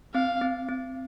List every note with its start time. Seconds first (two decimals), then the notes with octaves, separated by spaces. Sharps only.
0.14 C4 F5
0.41 C4
0.69 C4